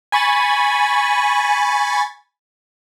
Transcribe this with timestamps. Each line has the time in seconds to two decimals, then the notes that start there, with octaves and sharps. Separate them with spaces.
0.12 G#5 B5 C#6 A6